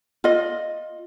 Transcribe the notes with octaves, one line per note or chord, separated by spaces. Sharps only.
F4 D#5